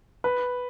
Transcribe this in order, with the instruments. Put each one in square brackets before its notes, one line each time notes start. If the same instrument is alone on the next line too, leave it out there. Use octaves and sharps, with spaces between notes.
[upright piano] B4